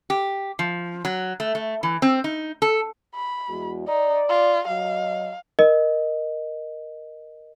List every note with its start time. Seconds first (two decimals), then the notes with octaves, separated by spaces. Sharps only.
0.10 G4
0.59 F3
1.05 F#3
1.40 A3
1.55 A3
1.83 E3
2.02 C4
2.24 D#4
2.62 A4
3.15 B5
3.49 E2 G#3 F#4
3.88 D#4 D5
4.29 F4
4.67 F#3 D#5 F5
5.59 A#4 D#5